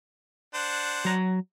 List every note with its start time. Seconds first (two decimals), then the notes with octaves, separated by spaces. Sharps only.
0.54 D4 C5 F#5
1.05 F#3 A#5